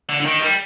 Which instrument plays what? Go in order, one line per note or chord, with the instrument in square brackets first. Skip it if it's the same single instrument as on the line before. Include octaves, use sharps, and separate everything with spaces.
[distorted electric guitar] D3
D3
D#3
G3